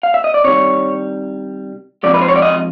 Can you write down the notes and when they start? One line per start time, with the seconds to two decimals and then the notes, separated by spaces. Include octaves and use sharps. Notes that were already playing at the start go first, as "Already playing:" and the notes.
0.03 F5
0.14 E5
0.24 D#5
0.34 D5
0.44 C3 D#3 G3 C#5
2.03 C3 F3 G#3 D5
2.14 B4
2.21 C5
2.28 C#5
2.36 D5
2.42 D#5